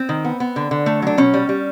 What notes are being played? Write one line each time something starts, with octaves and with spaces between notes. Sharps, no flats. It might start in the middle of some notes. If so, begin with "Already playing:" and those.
Already playing: C4
D#3
B3
B3
D3
D3
A3
F#3 D4
B2 C#4
G3
G3